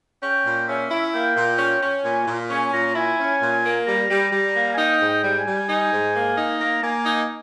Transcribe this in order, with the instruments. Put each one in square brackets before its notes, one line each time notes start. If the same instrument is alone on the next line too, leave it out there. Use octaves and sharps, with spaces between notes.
[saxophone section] C#4 [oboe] G5
[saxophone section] A#2
[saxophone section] C#4 [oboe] E5
[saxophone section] E4
[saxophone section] A#3 [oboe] G5
[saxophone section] A#2
C#4
C#4
[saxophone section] A#2 [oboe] G#5
[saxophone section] A#2
[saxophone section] C#4 [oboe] G#5
[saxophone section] A#2 [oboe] A#5
[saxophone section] E4 [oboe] G#5
[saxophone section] C#4
A#2
A#3
[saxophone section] G3 [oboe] A#5
[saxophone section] G3
G3
A#3
[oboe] G#5
[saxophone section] D#4 [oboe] G5
[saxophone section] G#2
[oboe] G5
[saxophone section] G3
[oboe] G#5
[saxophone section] G3
[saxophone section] D#4 [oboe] G#5
[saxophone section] G#2
A#3
D#4
[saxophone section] A#3 [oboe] A#5
[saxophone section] A#3 [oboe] G#5
[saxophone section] D#4 [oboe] G#5